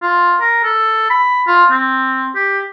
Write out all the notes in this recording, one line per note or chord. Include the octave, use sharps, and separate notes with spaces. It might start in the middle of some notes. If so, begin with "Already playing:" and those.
F4
A#4
A4
B5
F4
C4
G4